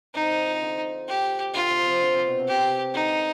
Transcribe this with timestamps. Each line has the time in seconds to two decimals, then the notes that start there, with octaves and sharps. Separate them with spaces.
0.15 C3 D#4
0.31 D#3
0.46 F3
0.62 D3
1.08 G4
1.54 D3 F4
1.70 C3
1.86 C3
2.01 D3
2.14 C3
2.27 B2
2.39 C3
2.48 G4
2.94 D3 D#4